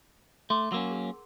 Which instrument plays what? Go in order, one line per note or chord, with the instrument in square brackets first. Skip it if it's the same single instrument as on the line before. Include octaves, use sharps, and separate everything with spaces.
[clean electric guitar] A3 [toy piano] C6 D6
[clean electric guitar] F#3 A#3 C#4 [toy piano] F#5 A#5 E6
[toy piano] G#4 A#4